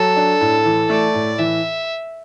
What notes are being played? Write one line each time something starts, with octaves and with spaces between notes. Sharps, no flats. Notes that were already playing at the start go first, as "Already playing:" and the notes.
Already playing: F#3 A4
D4
A2
E3
A3 D5
A2
E3 E5